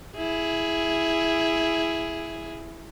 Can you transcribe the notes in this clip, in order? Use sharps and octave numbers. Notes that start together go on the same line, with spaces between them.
E4 G#4